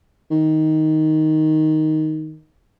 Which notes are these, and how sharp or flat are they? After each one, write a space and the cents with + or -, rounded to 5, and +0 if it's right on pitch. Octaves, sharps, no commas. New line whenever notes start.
D#3 +5